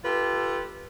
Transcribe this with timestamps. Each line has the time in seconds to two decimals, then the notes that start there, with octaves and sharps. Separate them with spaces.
0.04 F4 G4 A4 B4